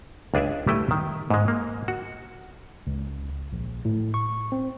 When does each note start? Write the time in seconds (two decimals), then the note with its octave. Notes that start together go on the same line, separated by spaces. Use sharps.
0.34 C#2 D4 G#4 D5 E5
0.67 G3 A3 E4 B4 G5
0.91 D#3
1.30 G#2 G#3
1.48 A#3
1.88 F#4
2.87 C#2
3.53 A#1
3.85 A2
4.14 C#6
4.52 C4